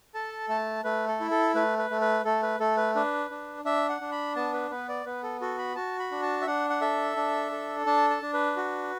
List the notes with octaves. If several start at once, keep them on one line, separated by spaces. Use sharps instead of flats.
A4 A5
A3 A5
A3 B4
A4
E4
A4
A3 B4
B4
A3
B4
A3 A4
B4
A3 A4
B4
D4 B4
D4
D4 E5
F#5
D4
B5
B3 A5
B4
B3 B4
D5
B3 B4
A4
F#4 A4
B5
F#4 A5
B5
D4
A5
E5
D4 F#5
F#5
A4 E5
D4
A4
D4 A5
A5
D4
B4
F#4